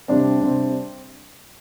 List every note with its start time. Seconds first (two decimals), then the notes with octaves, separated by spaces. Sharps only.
0.08 C3 G3 C4 D4
0.41 C3 G3 C4